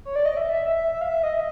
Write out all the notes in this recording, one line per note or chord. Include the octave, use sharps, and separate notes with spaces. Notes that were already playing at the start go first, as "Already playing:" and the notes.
C#5
D5
D#5
E5
E5
E5
F5
E5
D#5